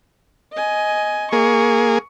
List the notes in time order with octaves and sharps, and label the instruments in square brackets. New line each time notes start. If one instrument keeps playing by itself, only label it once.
[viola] D#5 G#5
[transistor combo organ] A#3 G#4 [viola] C#6